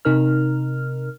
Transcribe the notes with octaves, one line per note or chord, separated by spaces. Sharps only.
C3 D#4 A#4 F6